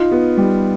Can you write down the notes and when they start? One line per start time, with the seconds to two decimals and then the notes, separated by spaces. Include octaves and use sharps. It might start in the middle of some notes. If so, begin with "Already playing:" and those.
Already playing: D#4 F4
0.11 B3
0.38 G3